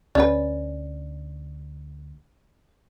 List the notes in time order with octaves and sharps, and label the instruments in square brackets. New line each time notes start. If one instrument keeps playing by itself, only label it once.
[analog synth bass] D2 [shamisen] C#4 B4 [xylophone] D5